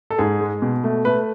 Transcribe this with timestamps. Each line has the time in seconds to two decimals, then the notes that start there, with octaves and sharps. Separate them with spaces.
0.10 A4
0.18 G#2 G#4
0.40 G#3
0.62 B2
0.84 A3
1.05 A3 B4